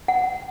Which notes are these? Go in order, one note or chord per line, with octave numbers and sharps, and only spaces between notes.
F#5